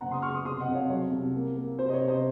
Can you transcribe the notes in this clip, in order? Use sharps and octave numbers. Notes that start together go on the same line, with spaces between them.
F#1 F#5 A#5
C6 D#6
F#1 C#6 F6
C6 D#6
C3 C6 D#6
D#5 F#5
F2
C#5 F5
F#3 C#5
C2
A#3
A#3
C3 C5
D#5
C#5
C3
C5 D#5